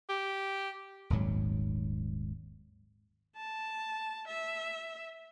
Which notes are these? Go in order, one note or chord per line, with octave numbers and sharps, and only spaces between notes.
G4
D#1 G#1 G#2 F#3
A5
E5